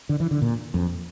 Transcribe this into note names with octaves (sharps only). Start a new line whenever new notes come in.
D3
E3
D3
A#2
F2